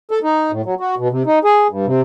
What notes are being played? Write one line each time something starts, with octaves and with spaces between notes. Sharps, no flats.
A4
D#4
A2
F#3
F#4
B2
C3
D#4
G#4
G2
C3